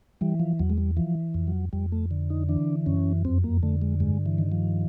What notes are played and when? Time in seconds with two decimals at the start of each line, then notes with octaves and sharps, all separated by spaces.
0.21 E3 G3
0.40 F3
0.59 E2 F#3
0.70 G#3
0.78 G3
0.97 E3 F3
1.34 F2
1.47 F#3
1.73 F2 G3
1.92 A3
2.11 D3
2.30 D#4
2.49 E3 D4
2.86 F#2 C#4
3.25 F2 C4
3.44 A#3
3.63 D3 A3
3.82 G#3
4.00 G2 G#3
4.26 E3
4.38 D#3
4.52 F3